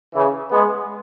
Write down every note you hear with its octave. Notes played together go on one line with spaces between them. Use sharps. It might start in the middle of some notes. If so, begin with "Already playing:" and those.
C#3 E3
G#3 B3